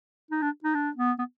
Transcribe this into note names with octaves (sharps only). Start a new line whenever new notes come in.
D#4
D4
D#4
D4
B3
B3